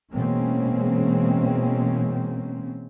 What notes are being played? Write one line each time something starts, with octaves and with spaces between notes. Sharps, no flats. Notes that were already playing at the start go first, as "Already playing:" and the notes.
B2 E3 G#3 A#3 C4 C#4